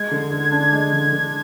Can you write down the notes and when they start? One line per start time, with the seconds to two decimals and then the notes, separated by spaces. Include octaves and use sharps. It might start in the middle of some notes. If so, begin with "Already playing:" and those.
Already playing: G#3 G#6
0.11 D3
0.31 D3
0.52 D4
0.72 G#3
0.93 D3
1.13 D3